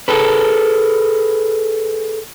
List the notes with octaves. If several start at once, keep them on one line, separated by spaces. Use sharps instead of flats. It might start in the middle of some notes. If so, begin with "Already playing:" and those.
G#4 A4 B4